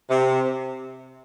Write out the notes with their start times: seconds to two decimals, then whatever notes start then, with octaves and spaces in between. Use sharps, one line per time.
0.09 C3